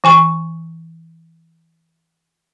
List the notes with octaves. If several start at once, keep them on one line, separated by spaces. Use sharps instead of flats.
E3 G#5 C#6